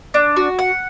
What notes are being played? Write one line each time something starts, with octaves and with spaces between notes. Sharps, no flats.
D4
F#4
F#5